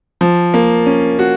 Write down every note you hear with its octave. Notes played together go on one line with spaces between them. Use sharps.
F3
A#3
C#4
F#4